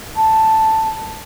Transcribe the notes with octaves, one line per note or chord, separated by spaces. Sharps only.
A5